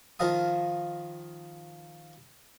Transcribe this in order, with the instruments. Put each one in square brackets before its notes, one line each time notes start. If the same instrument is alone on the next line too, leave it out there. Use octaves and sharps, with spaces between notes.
[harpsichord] D#3 F3 D#5 F5 A5 D#6